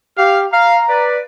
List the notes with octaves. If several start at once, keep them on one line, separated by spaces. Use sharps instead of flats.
G4 F5 F6
F5 A#5
B4 D5